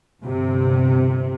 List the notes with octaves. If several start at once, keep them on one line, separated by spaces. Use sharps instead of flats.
G1 C3